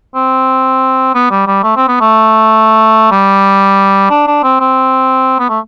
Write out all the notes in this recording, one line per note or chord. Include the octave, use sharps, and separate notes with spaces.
C4
B3
G3
G3
A3
C4
B3
A3
G3
D4
D4
C4
C4
B3
A3